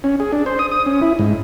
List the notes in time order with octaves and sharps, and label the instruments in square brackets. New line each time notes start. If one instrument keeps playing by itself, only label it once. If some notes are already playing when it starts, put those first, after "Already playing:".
[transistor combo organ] C#4
G#4
D4
C5
D#6
D#6
C#4
E4
G#2